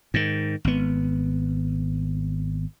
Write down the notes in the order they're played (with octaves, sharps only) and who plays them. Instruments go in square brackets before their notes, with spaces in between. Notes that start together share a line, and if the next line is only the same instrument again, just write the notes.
[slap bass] G#2 D#3
G#1 B3